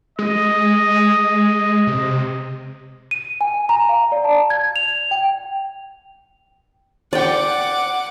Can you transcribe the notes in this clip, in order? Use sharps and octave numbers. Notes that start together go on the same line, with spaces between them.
G#3 D#5
C3
D#7
G#5
A#5
F5
D5
A5
G#6
F7
G5
D5 F#5 G5 D6